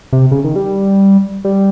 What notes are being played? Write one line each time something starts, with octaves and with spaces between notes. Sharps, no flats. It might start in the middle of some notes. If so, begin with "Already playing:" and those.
C3
C#3
D#3
G3
G3